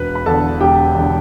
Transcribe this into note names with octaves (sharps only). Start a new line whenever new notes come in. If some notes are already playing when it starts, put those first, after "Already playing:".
Already playing: E1 B4 B5
B5
E2 D3 A4 A5
E1 G4 G5
E2 D3